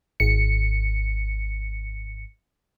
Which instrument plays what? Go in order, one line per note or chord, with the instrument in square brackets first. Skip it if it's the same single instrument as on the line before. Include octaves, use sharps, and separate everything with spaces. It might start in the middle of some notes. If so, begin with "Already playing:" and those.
[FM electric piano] G#1 C#7